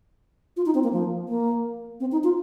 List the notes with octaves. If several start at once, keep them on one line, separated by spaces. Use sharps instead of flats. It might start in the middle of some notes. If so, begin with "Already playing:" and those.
F4
D#4
C4
A#3
F3
A#3
C4
D#4
F4